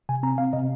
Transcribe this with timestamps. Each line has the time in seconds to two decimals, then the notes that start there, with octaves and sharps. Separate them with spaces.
0.09 C3 G#5
0.23 C4 A#5
0.38 C4 F5
0.53 C3 D#5